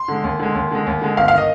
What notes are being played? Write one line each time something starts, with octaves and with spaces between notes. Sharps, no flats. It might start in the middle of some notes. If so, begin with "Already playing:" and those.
Already playing: C6
D3 G#3
D#2
D3 G#3
D#2
D3 G#3
D#2
D3 G#3
G1 F5
F5
D#3 D#5